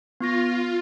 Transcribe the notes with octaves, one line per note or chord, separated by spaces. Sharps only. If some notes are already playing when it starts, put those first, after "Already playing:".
B3 F4 C#6 A#6